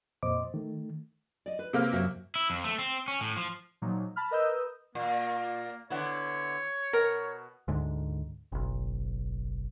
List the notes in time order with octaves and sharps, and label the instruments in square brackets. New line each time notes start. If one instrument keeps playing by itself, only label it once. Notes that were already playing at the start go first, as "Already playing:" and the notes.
[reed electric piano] F2 A#2 C5 D#5 D6
D#3 A3
[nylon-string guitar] D5 D#5
B4
[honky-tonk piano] C3 A#3 F6
[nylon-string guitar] F#2 F#4 E5
[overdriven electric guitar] E4
F2
A3
C4
C#4
A2
F3
[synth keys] A#2 F3 F#3 A#3 D#4
A5 B5 F6
A#4 B4 D#5 D#6 E6 G6
[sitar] A#2 [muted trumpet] A#3
[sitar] D3 B3 E4 [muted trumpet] C#5
[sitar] B2 [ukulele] A#4
[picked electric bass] D2 G#2 D3
F#1 B1